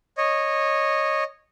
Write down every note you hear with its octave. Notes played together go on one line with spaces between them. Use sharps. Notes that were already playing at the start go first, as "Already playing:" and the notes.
C#5 D#5